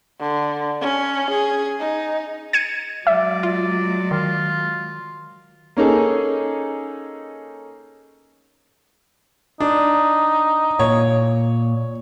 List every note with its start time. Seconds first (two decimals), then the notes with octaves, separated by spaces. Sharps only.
0.20 D3
0.82 C#4
1.31 G#4
1.80 D#4
2.53 G#6 C#7 D#7
3.07 F#3 G#3 D5 E5
3.43 F4
4.11 D#3 F4
5.77 A#3 C#4 D#4 G#4 A4
9.60 D4 D#4
10.79 A#2 C#5